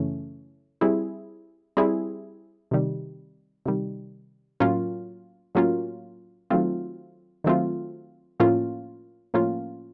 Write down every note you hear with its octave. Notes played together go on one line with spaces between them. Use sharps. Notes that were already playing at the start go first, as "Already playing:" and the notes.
Already playing: F#2 C#3 E3 A3 C#4
G3 C4 E4 G#4
G3 C4 E4 G#4
C3 D#3 G3
C3 D#3 G3
A2 F#3 A#3 C#4 F4
A2 F#3 A#3 C#4 F4
D#3 F#3 A3 C4 F4
D#3 F#3 A3 C4 F4
A2 F3 A#3 C#4 F4
A2 F3 A#3 C#4 F4